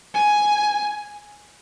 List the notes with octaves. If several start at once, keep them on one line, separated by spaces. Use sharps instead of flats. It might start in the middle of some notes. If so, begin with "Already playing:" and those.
G#5